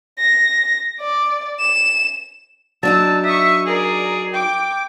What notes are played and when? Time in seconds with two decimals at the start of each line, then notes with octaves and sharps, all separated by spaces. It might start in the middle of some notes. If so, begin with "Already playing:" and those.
0.19 A#6
1.00 D5
1.60 E7
2.83 F#3 D4 D#4 A5 E6
3.24 E5 C#6 D#6
3.67 G#4 A#4 D5
4.33 G5 D6